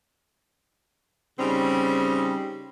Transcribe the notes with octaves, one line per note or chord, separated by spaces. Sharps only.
C#3 G3 C4 C#4 D#4